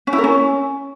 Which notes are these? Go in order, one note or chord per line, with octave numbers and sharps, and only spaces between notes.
C#4
E4
A#4
C#4